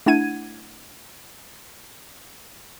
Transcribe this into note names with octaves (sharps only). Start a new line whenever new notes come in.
A3 D4 E4 F#5 G#6 D#7